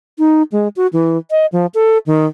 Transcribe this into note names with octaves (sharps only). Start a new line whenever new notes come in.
D#4
G#3
F#4
E3
D#5
F3
A4
D#3